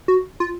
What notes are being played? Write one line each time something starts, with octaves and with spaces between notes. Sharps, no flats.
F#4
F4